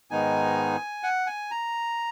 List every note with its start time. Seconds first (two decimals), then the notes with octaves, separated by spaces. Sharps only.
0.11 G#2 D#3 G#3 B3 D#4 G#5
1.03 F#5
1.27 G#5
1.51 A#5